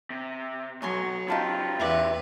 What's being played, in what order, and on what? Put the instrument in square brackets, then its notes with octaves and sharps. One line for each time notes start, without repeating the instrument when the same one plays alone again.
[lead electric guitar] C3
[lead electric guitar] B1 [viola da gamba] F#3 [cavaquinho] C#5 G#5 C6
[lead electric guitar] C#3 G4 [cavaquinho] D#4 A5 B5 [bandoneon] F4
[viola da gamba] E2 B4 [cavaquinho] E4 D5 E5